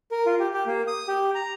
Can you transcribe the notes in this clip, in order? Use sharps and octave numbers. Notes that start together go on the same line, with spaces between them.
A#4
F4
G4
G4
A#3
D#6
G4
A#5